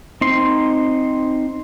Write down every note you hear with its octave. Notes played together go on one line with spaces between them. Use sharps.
C4 D#4 C6